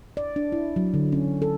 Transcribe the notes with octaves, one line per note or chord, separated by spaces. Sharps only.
D5
D4
E4
F#3
D3
C#4
A4